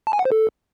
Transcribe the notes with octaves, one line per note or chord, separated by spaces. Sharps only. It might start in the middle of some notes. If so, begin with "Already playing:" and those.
A5
G#5
F#5
C5
A4